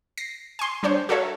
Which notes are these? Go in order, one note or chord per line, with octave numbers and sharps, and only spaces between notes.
A#6 C7
G#5 C6
G3 D4 C5 C#5
F#4 A4 A#4 C#5 E5